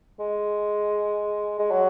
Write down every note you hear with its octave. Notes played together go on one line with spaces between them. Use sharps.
G#3
G#3
F#3